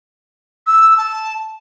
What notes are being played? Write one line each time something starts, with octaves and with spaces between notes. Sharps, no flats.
E6
A5